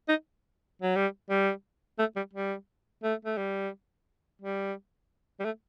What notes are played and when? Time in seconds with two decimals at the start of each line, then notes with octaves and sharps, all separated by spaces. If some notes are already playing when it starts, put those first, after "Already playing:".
0.09 D#4
0.82 F#3
0.96 G3
1.30 G3
1.99 A3
2.16 G3
2.33 G3
3.03 A3
3.25 A3
3.37 G3
4.42 G3
5.40 G3
5.45 A3